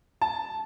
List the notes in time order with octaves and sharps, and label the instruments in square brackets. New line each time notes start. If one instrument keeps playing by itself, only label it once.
[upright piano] A5